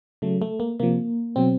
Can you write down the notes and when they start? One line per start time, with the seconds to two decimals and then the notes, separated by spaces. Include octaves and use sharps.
0.22 C#3 F#3 A3
0.42 A3
0.60 A#3
0.80 C3 F3 A#3
1.36 B2 F#3 C4